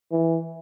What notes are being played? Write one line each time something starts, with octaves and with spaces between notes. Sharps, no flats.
E3